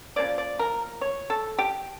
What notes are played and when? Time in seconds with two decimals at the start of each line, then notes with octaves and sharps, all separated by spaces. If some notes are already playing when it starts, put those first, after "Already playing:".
0.16 C#3 F3 A#3 D5
0.38 D5
0.59 A#4
1.01 C#5
1.30 A4
1.58 G4